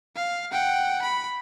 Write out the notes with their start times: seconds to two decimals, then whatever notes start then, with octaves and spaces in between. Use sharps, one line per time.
0.15 F5
0.51 F#5 G5
1.02 B5